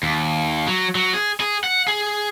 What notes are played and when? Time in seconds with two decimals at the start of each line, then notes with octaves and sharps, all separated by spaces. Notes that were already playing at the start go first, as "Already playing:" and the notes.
0.03 D#2
0.68 F#3
0.95 F#3
1.14 G#4
1.40 G#4
1.64 F#5
1.88 G#4